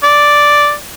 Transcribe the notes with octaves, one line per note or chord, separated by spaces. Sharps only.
D5